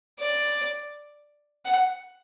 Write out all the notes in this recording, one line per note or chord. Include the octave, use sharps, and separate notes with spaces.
D5
F#5